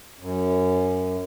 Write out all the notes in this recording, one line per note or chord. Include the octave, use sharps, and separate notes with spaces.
F#2